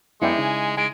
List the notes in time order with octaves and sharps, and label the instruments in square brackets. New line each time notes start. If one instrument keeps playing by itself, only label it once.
[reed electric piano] F#2 B3 [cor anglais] G#3 [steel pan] E4 D5 G5 [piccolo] C#7
[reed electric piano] C#3 D#4 [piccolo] G#5
[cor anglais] G#3 [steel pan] G#5 [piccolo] D7